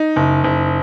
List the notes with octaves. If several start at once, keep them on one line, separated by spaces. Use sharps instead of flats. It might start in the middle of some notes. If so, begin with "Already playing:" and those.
Already playing: D#4
F#1
F#1